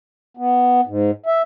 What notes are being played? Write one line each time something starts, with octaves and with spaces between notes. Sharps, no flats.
B3
G#2
E5